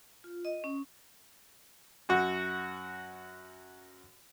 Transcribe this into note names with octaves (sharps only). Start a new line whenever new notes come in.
F4
D#5
C#4
F#2 F#4